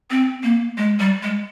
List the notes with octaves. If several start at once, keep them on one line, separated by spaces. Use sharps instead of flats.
C4
A#3
G#3
G3
G#3